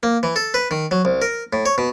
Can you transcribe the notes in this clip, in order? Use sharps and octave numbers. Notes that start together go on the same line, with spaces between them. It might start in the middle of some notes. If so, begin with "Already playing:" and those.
A#3
E3
A4
B4
D#3
F#3
C2
A#4
A2
C#5
B2